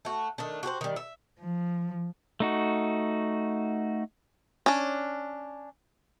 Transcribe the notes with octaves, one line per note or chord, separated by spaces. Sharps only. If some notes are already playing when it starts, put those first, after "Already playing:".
A3 F#4
D#3 A3 D4
F#4 G4 A4 C5
D#3 G3
E5
F3
A3 D#4 F#4
C#4 D4